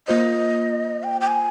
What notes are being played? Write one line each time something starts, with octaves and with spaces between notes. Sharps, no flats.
A#3 F4 C5 D#5
G5
G5
G#5